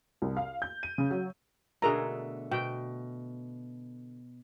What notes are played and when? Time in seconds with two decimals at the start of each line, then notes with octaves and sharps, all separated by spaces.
0.22 C2
0.37 F5
0.62 G6
0.83 D#7
0.98 C#3
1.11 F#3
1.82 B2 D3 A3 G#4 A#4 A#5
2.51 B2 G5